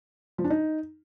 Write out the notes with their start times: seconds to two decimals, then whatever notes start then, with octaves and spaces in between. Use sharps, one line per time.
0.38 F3
0.44 D4
0.50 D#4